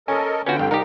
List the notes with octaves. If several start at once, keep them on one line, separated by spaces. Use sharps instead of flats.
C#4 A4 A#4 D#5 G#5
D3 B3 C#4 F4 F#4 G5
G1 C2
C2 D#4 G4 A#4